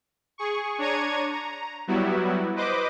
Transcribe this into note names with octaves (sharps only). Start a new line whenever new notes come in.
G#4 C#6
D4 C#5 A#5 C#6 G#6 D#7
A#5
F#3 G3 B3 E4 F#4
B4 C5 D#5 D6